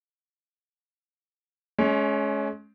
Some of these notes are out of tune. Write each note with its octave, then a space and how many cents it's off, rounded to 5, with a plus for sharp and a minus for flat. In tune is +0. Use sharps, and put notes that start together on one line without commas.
G#3 +35 C#4 +10